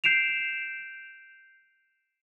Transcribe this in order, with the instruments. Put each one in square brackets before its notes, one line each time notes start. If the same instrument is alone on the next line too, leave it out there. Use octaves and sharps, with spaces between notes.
[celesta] G6 C7 D7 E7 F7